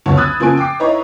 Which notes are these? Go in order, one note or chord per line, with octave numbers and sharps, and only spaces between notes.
G1 C#2 F#3 F#4 C#5 A5
B5 D#6 E6 F#6 G#6 A6
C#3 F3 A#3 G#5 C6 D7
G5 D6 C7
D#4 E4 B4 C#5 D#5 A#5